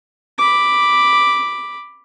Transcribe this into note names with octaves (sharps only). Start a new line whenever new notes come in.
B5 D6